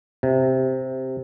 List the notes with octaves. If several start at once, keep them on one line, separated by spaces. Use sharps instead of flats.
C3